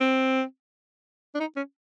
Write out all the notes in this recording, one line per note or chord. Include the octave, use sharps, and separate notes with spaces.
C4
D4
D#4
C#4